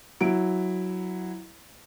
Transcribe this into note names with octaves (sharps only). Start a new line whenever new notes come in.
F#3 E4 D7